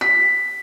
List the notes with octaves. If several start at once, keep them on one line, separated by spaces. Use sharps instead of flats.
B6